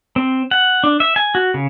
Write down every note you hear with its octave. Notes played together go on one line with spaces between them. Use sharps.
C4
F#5
D4
E5
G#5
F#4
C#3